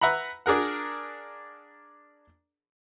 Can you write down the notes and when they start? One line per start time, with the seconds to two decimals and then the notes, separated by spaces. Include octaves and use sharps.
0.01 B4 E5 F#5 A#5 B5
0.46 D4 G#4 A#4 F#5